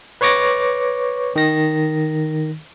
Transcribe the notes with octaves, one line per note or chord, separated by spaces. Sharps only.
B4 C#5 C#6 D6 A#6
D#3 A#6